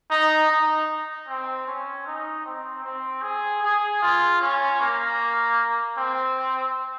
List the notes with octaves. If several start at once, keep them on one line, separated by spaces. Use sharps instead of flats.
D#4
D#4
C4
C#4
D#4
C4
C4
G#4
G#4
F4
C#4
A#3
C4